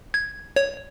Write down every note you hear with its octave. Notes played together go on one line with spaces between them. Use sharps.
G#6
C#5